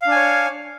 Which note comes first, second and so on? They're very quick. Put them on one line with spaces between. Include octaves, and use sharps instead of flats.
F5 D4 G#5 C#5